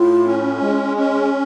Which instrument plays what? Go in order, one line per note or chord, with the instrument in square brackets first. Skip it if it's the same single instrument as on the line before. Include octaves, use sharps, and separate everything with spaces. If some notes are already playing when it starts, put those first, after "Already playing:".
Already playing: [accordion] A2 [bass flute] F4
[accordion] C#4
G#3
C#4